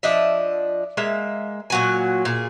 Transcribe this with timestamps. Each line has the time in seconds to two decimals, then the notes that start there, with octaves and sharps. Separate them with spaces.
0.03 F3 D4 D#5 E5
0.97 G#3 A#3 E5
1.70 A#2 F#3 G#5
2.25 A#2 G#4